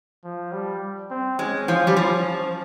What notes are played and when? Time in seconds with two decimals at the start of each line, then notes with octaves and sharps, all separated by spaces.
0.24 F3
0.52 G3
1.10 C4
1.39 G#3 C#4
1.68 F3
1.87 G3
1.96 F3